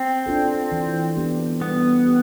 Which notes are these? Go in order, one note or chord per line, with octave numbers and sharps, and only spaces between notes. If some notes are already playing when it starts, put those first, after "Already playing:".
Already playing: C4
D4 F4 A4
E3
B3 D4 G4
G3 B3
G4